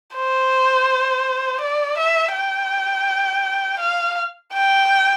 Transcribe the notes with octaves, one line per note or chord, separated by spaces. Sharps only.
C5
D5
E5
G5
F5
G5